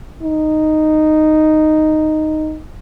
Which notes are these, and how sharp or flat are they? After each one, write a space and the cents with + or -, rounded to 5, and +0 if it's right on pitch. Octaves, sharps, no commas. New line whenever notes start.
D#4 -5